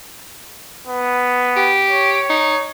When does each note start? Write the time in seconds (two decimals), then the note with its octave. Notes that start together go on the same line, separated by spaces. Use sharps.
0.87 B3
1.56 G4
1.89 C#5
2.30 D#4